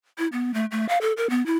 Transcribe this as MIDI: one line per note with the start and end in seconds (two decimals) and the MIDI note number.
0.18 0.27 64
0.32 0.54 59
0.54 0.65 57
0.71 0.87 57
0.89 0.98 77
1.01 1.13 69
1.17 1.29 70
1.30 1.44 59
1.46 1.57 64